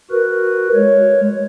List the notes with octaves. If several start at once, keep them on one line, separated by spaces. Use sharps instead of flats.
F#4 A#4 B4
G#3 C#5